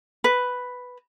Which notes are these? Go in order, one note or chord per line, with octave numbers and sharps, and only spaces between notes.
B4